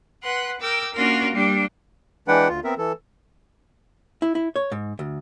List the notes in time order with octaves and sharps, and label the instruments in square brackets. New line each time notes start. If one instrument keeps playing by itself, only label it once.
[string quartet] B4 F#5 C6 F#6
A#4 G5 D6 E6
A#3 C#4 D4 F4 F#4 A#4
G3 A#3 D4 G4
[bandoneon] E3 G#3 D4 B4 F#5 G5
D2 F4
B3 C4 A#4 E5
E3 A4
[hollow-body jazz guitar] E4
E4
C#5
G#2
D2